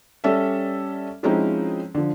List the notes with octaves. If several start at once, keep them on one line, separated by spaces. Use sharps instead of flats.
G3 C#4 A4 D5 E5
F3 G#3 C4 C#4 D#4 E4
D3 F3